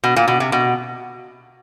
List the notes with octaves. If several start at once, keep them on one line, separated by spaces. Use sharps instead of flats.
B2
A#2
B2
C3
B2